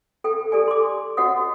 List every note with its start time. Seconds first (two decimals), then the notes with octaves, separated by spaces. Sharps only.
0.24 A4 G5
0.52 G4 A4 D5 G#5
0.68 C6 D6
1.17 F#4 C#5 D#5 F#5 D#6